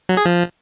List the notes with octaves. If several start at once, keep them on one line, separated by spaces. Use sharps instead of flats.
F#3
G#4
F3